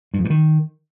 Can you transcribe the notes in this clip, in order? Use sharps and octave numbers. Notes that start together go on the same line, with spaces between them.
G2
F2
G2
D#3